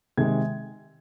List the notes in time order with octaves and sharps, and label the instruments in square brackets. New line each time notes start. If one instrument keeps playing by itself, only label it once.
[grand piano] C3 D#3 G#3 G#6